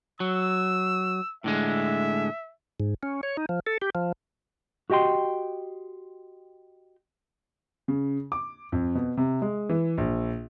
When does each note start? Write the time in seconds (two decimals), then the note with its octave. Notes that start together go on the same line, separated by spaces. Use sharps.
0.20 F#3 E6
1.44 A2 D3 G#3 E5
2.80 G#2
3.03 C#4
3.23 C#5
3.37 D#4
3.49 F3
3.67 A4
3.82 G4
3.95 F3
4.90 F#4 G4 D#5 G5 C6
7.88 C#3
8.32 D6
8.72 F2
8.95 B2
9.17 C3
9.42 G#3
9.69 E3
9.98 A#1